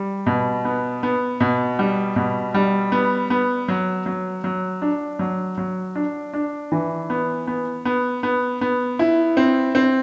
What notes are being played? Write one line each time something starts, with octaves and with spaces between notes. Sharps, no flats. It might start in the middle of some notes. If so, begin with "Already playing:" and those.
Already playing: G3
B2
B3
B3
B2
G3
B2
G3
B3
B3
F#3
F#3
F#3
D4
F#3
F#3
D4
D4
E3
B3
B3
B3
B3
B3
E4
C4
C4